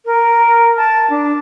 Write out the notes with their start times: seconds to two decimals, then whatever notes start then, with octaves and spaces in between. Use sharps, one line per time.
0.06 A#4
0.77 A5
1.10 D4